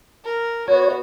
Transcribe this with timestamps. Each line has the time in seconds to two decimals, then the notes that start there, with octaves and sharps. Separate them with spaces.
0.24 A#4
0.68 B3 F#4 C#5